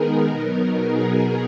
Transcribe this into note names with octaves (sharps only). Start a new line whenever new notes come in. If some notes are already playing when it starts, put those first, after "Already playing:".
Already playing: D#3 G#3 B3 D#4 G#4 A#4
B2 F#3 B3 D#4
G#4